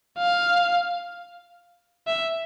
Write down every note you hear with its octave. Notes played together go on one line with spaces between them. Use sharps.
F5
E5